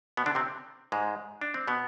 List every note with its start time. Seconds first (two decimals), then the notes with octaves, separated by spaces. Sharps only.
0.17 B2 B3
0.26 D3 D4
0.35 C3 C4
0.92 G#2 G#3
1.41 D4
1.54 C4
1.68 B2 B3